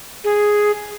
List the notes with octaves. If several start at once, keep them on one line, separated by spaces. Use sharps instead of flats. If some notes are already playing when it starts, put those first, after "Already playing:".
G#4